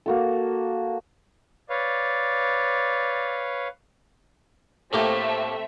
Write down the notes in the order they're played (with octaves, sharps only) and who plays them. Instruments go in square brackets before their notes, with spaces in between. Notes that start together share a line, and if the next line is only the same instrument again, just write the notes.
[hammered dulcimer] A#3 F#4 A4
[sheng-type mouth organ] B4 C#5 F5 [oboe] D5
[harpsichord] A2 A#3 G4 [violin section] A3 C4 E5